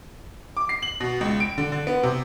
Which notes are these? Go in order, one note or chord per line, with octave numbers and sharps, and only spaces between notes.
D6
C7
F#7
B2
C#2
D7
D3
D3
B3
C3